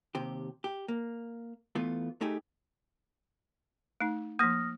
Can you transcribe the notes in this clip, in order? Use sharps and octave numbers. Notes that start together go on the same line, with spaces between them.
D#2 C3 G4
G4
A#3
E3 A3 B3 F4
A3 D#4 G4 G#4
A3 D#4
F3 A#3 D#6 F6 A#6